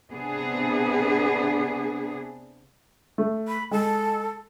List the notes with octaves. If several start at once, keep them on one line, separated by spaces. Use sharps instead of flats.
C3 B3 D4 G#4
A3
B5
G#3 A4